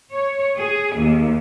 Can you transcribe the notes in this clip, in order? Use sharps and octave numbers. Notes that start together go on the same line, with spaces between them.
C#5
G#4
D#2